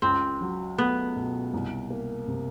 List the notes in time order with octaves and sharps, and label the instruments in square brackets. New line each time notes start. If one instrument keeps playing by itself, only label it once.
[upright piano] C#2 [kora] C4
[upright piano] F#3
[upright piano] A3 [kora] B3
[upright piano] B2
C2
A#3
C3